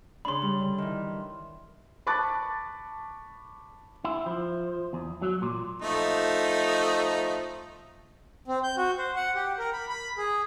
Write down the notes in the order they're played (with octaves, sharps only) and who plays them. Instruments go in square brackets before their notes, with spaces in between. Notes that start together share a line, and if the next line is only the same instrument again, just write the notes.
[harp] C#3 D4 [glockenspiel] B5 C6
[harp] G3
D3
D#3 E3
[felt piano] A5 B5 C#6 D6 F#6 A6
[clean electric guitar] E4
F3
E2
F#3
A#2
[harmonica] F3 A3 D#4
[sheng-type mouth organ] C4
G6
F#4
C5
F#5
G4
A#4
B5
B5
G#4